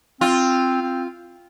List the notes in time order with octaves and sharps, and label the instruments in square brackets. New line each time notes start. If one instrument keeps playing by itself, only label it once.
[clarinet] C4 [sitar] F4
[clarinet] C4